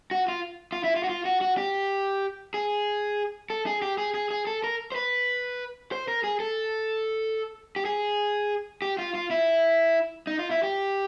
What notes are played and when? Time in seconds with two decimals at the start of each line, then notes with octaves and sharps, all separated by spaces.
0.11 F#4
0.28 F4
0.72 F4
0.84 E4
0.96 F4
1.04 F#4
1.09 F4
1.25 F#4
1.41 F#4
1.57 G4
2.54 G#4
3.50 A4
3.66 G#4
3.82 G4
3.98 G#4
4.14 G#4
4.31 G#4
4.47 A4
4.64 A#4
4.92 C5
4.96 B4
5.92 C5
6.08 A#4
6.24 G#4
6.40 A4
7.76 G4
7.85 G#4
8.82 G4
8.99 F4
9.15 F4
9.30 E4
10.27 D#4
10.39 F4
10.51 E4
10.63 G4